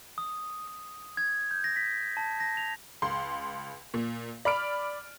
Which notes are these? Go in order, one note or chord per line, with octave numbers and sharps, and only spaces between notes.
D#6
D#6
G#6
G6
A#6
B6
A5
A#6
F7
C#2 C6
A#2
D5 B5 F6 D7